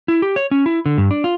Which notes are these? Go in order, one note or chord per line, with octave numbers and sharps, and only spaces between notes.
E4
G4
C#5
C#4
E4
D3
G2
D4
F4